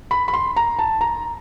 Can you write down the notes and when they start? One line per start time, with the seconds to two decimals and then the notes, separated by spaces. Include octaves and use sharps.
0.11 B5
0.28 B5
0.33 C6
0.56 A#5
0.79 A5
1.01 A#5